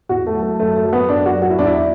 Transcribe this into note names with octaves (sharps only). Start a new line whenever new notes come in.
E2 F#4
A3
F#3
A3
F#2 A3
A3
F#3
B3
F#2 D4
F#4
F#3
F#4
E4
E2 D4
E4